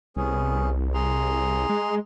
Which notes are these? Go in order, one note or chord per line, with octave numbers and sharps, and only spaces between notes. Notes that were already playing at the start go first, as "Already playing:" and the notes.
C2 B3 C#4 G#4
G#4 A#5 C6
G#3